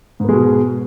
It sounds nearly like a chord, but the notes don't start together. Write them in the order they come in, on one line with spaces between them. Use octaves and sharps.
G#2 B3 G#3 B2